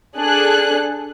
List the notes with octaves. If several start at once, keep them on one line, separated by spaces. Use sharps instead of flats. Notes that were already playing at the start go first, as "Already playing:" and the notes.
D4 G#4 A4 F#6